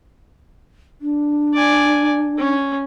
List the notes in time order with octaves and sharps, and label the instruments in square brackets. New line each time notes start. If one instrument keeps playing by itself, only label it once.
[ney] D4
[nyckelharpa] D5 G#5
C#4